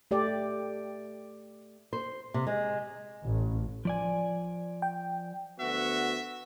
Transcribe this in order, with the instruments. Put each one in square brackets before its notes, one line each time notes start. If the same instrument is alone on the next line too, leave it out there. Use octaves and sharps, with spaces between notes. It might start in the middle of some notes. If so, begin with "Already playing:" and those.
[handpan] A3 G4 D5
[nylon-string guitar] C5
C3
G#3
[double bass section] A1
[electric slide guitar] F3 D5 G#5
[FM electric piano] G5
[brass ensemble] D2 B3 F#4 [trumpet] E5